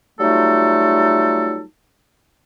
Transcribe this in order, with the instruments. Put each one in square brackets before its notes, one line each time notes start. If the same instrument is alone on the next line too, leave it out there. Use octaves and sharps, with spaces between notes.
[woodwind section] F#3 G3 A3 D#4 F4 A4